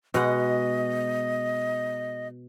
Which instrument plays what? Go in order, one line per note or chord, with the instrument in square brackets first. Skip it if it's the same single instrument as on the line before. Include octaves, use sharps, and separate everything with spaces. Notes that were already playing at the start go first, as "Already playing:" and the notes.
[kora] B2 G#3 F#5 [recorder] D#5